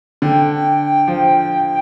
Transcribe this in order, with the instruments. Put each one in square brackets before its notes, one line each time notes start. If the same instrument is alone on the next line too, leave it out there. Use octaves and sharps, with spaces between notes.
[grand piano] D3 [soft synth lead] G5
[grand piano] F3